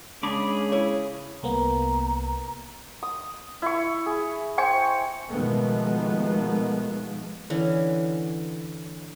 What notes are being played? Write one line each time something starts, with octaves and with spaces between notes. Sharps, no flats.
C#3 G#3 D4 G#4 B5 D6
E4 C#5
C2 A#3 B3 A#5
D#6
E4 C#6
G#4
C5 G5 G#5 C#6
B2 D#3 F3 G#3 A3 B3
D3 E3 C#4